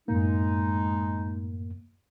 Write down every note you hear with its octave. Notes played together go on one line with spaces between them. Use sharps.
F#2 A2 G#3 A#3 D#4